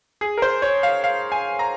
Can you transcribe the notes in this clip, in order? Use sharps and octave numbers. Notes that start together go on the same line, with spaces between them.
G#4
A#4
C5
C#5
F5
F5
G#5
A#5